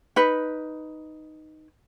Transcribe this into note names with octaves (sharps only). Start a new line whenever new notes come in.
D#4 B4